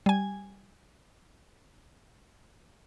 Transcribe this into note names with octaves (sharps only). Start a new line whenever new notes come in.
G3 G#5